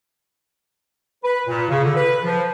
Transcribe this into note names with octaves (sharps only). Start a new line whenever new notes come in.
B4
A#2
C#3
D3
B4
F3